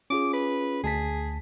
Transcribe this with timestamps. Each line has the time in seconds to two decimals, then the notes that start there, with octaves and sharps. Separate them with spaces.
0.10 C#4 F4 G#4 D6
0.33 B4
0.84 D2 G#4 A5 B6